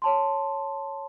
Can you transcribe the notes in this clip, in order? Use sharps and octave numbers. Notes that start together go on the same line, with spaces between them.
C#5 A5 C6